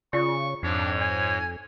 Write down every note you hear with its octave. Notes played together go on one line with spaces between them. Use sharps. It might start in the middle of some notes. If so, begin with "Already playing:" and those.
C#3 F4 D5 C#6
F2 G#2 D4 C#5
G#5